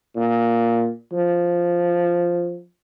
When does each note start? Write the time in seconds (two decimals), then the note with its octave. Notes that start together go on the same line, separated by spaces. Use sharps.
0.16 A#2
1.12 F3